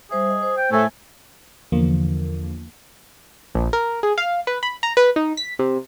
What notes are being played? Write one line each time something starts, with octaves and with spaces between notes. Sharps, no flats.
G3 G#4 C5 E5
D#5
C5
G5
A2 A3 G#5
E2 D3 F3 A#3
A#1
A#4
G#4
F5
B4
B5
A#5
B4
D#4
B6
C3